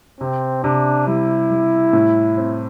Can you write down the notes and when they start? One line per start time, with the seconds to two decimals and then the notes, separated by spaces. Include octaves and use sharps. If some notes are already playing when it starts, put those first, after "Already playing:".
0.20 C3 C4
0.64 C3 D4
1.07 G3 E4
1.51 G3
1.93 A2
2.37 C4